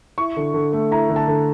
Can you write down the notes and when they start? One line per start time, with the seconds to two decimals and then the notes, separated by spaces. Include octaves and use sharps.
0.18 E4 C#6
0.37 D3
0.54 D3
0.73 A3
0.91 E4 A#5
1.10 D3
1.16 A5
1.28 D3